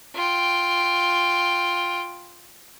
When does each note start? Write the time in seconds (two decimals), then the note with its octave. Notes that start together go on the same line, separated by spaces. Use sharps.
0.15 F4 G5